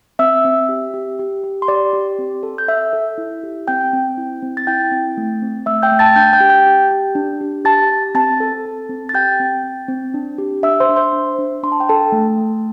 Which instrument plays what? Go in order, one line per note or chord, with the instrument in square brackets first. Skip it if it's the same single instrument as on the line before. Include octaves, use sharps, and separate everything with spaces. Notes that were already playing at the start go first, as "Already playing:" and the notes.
[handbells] C4 E5 E6
C4
G4
G4
G4
G4
C6
G4 D5 D6
G4
C4
A4
G6
A4 E5 E6
A4
E4
G4
C4 G5 G6
C4
E4
C4
A6
E4 G5 G6
C4
A3
C4
A3 E5 E6
G5 G6
A3
A5 A6
D4 G5 G6
G5 G6
G4
G5 G6
G4
G4
D4
G4
G4 A5 A6
G4
C4 A5 A6
A4
A4
C4
A6
G4 G5 G6
C4
C4
C4
D4
G4
D4 E5 E6
C5 C6
D4
C5 C6
D4
D4
D4 C6
A5
G5
A4 A5
A3
A3